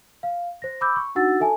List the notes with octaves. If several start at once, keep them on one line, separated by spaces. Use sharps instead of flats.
F5
C5 A#6
B5 D6 E6 G6
C#6
D4 D#4 F#4 F#5 E6 A6
A4 E5 G#5 A5